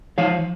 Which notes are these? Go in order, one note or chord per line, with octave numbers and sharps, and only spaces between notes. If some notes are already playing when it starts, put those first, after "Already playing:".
F3 C#5 F5